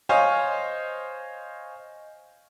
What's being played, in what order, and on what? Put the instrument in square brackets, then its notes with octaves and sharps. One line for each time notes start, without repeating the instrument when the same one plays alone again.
[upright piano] C5 C#5 D#5 F5 G#5